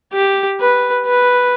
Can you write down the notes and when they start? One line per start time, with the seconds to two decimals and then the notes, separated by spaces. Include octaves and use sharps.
0.13 G4
0.60 B4
1.06 B4